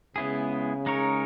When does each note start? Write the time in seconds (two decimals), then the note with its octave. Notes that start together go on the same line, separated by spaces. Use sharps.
0.16 C#3 G#3 B3 E4 G#4
0.86 G#3 D#4 A#4 C#5